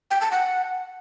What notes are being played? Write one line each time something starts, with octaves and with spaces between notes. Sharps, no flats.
G5
A5
F#5